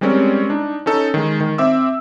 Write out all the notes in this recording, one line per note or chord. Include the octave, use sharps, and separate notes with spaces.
G3 G#3 C4 C#4 A#4 D5
D4 D#4
C#4 D#4 A4
D#3 G#3
D#3
C4 E5 D6 E6